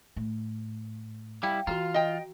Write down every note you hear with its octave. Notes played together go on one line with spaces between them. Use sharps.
A2
G3 E4 F5 G5
E3 F4 F#4 B4 A#5
D#5 G5